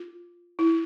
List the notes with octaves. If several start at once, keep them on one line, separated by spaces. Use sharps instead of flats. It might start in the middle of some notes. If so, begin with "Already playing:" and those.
Already playing: F4
E4